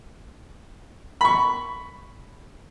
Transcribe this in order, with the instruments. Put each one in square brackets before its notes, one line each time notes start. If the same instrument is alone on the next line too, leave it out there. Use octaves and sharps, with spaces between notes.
[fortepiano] B5 C#6